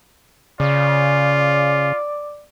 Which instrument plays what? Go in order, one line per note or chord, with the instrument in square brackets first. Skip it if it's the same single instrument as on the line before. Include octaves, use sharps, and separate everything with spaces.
[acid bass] C#3 [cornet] F4 [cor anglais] D5